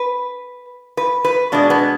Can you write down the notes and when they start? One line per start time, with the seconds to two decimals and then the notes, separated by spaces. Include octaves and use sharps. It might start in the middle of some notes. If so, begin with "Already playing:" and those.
Already playing: B4
0.97 B4
1.25 B4
1.52 B2 G#3 D4
1.70 B3